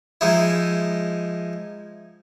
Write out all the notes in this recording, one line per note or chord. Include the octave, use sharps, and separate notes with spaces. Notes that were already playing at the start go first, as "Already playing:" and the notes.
F3 G#3 D#4 E4